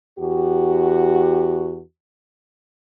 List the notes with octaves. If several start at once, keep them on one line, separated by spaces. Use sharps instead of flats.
E2 F#4 G4